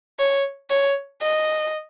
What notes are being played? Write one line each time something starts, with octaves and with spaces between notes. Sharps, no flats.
C#5
C#5
D#5